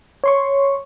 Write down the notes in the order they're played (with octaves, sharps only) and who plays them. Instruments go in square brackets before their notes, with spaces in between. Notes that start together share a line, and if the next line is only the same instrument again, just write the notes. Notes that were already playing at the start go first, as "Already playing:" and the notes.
[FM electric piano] C#5 C6 C#6